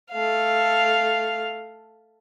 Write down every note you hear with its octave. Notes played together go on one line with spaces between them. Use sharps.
A3 F5